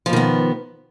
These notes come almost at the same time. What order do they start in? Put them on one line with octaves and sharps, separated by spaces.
F3 B2 D#3 B3